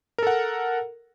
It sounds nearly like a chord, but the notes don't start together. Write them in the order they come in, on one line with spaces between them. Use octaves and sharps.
A#4 A4 F#5